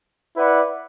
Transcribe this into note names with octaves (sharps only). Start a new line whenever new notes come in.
E4 B4 D5 F#5